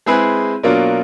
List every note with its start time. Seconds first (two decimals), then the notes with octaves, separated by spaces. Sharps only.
0.06 G#3 C4 E4 G#4 B4
0.63 B2 F#3 A#3 D4 F4